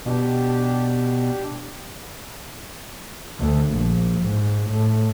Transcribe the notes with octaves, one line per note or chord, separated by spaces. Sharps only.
B2 D4 G4
D2
A#1
G#2
A2